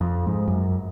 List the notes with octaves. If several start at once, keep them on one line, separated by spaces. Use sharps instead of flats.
F2
G#2
F#2